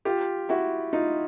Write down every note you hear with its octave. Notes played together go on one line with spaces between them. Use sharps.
F4 G4
E4 F#4
D#4 F4